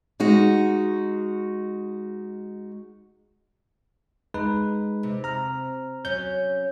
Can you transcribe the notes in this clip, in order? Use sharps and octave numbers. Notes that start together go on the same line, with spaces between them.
G#3 D#4 F#4
G#3 D#4 B4
C3
A#5 F6
F#3 C#4 C#5 G6